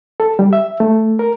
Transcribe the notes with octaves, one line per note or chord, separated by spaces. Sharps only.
A4
G3
E5
A3
A#4